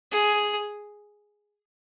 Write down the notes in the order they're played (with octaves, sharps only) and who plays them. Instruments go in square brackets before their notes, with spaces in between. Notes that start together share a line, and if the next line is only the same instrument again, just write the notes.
[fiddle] G#4